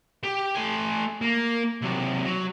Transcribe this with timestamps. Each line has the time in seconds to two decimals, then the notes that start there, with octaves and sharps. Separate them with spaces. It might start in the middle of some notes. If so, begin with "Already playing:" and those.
0.24 G4
0.55 A3 G#5
1.21 A#3
1.82 C3 F#3
2.25 F#3